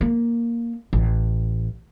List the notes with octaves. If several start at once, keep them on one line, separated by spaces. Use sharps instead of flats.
A#3
A1